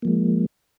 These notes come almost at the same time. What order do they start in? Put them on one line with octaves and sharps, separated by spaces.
A#3 F3 G#3